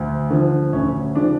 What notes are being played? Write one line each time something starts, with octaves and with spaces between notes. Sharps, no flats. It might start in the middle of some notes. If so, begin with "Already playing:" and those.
Already playing: D2
D3 F3
D2 C#4
C#3 F3 D4